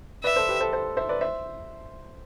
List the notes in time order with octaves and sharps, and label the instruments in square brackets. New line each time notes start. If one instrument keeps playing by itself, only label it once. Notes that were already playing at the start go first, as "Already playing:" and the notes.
[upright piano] B4 D5 [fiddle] E5
[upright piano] A4 C5
G4 B4
A4 C5
A4 C5
C5 E5
B4 D5
C5 E5